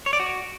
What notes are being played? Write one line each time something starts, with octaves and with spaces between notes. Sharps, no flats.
C#5
D5
F#4